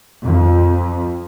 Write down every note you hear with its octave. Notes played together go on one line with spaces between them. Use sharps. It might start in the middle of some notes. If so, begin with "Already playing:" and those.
F2